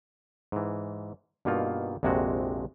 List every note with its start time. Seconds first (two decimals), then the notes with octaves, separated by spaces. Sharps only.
0.52 G#2 E3
1.45 G2 B2 A#3 D#4 F4
2.03 A#1 F2 C3 G#3 F#4